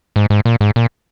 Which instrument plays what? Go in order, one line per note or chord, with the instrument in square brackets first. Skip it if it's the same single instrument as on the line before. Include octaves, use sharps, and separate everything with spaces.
[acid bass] G#2
G#2
A#2
G#2
A#2